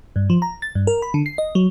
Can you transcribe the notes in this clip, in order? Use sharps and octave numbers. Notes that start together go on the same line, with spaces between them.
G2
F3
A#5
A6
G2
A#4
B5
D3
C7
D#5
F#3